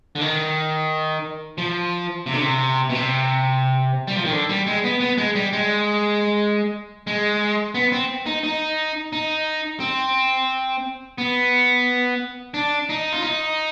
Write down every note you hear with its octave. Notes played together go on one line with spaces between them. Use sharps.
D3
D#3
F3
C3
D3
C3
B2
C3
G3
F3
D#3
D3
G3
G#3
B3
B3
G#3
G3
G#3
G#3
B3
C4
D#4
D#4
D#4
C4
B3
D4
D#4
F4
D#4